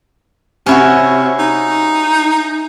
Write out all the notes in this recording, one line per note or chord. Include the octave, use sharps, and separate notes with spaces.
C3 C#4 E4 F#4
D#4